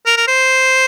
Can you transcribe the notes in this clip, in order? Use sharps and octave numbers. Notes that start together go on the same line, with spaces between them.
A#4
A#4
C5